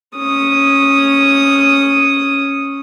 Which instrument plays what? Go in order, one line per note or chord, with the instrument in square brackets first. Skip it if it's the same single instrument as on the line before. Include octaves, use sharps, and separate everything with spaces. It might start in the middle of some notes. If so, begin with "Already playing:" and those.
[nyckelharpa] C#4 D#6